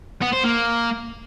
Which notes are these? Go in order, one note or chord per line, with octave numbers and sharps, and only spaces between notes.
B3
C5
A#3